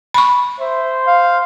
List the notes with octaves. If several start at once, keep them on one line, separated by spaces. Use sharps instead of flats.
B5 C#6
C5 E5
F5